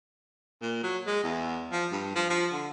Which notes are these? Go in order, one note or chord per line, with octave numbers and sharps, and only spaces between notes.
A#2
F#3
G#3
E2
F3
G2
F3
F3
D3